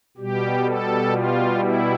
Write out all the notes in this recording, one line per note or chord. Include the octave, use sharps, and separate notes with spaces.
B2 G3 G4
A4
F4
E4